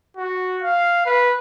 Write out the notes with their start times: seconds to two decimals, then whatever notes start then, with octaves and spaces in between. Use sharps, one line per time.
0.17 F#4
0.62 F5
1.06 B4